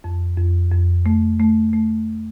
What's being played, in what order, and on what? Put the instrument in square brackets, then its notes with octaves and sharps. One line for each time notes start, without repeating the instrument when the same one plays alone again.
[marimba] F2
F2
F2
A3
A3
A3